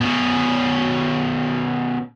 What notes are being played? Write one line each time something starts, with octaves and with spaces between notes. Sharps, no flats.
B2 C#4